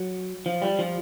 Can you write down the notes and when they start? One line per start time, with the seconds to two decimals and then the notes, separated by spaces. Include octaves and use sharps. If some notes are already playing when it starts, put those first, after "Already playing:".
Already playing: F#3
0.46 F3
0.62 G3
0.79 F3